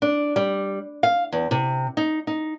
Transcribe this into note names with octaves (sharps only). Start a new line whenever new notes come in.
D4
G3
F5
E2
C3
D#4
D#4